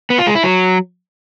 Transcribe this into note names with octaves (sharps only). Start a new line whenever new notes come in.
B3
F4
G#3
E4
F#3